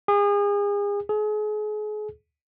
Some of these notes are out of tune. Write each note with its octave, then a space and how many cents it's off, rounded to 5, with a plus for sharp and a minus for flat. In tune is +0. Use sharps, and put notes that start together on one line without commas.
G#4 -35
G#4 +35